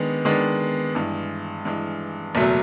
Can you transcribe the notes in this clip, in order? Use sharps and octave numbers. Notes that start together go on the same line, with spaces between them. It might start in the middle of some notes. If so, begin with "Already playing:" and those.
Already playing: D#3 G#3 B3 D4
D#3 G#3 B3 D4
G2 E3 G#3
G2 E3 G#3
F#1 E2 B2 F#3 A3